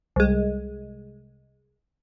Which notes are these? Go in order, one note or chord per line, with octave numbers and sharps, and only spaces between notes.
C2 G#3